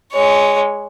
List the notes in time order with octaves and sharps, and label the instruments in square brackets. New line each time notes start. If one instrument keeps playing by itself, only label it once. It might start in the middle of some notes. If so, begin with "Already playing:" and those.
[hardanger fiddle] G#3 C#5